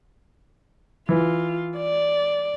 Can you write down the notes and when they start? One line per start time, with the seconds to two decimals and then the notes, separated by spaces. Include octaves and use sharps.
1.09 E3 F4
1.77 D5